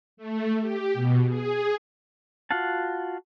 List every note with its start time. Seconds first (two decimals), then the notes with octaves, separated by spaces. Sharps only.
0.17 A3
0.61 G4
0.94 B2
1.28 G#4
2.51 F4 F#4 F5 F#5 A5